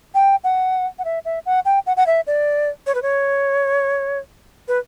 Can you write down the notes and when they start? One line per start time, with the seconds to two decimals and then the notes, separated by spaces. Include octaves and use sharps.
0.15 G5
0.44 F#5
0.99 F#5
1.05 E5
1.25 E5
1.46 F#5
1.65 G5
1.86 F#5
1.97 F#5
2.07 E5
2.27 D5
2.87 C#5
2.95 B4
3.02 C#5
4.68 B4